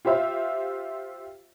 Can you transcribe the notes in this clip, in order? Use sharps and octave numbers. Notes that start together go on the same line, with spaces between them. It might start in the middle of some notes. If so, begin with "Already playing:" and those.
F4 G4 C5 E5 F5